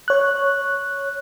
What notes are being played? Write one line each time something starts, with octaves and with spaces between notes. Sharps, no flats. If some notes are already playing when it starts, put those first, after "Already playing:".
C#5 F#6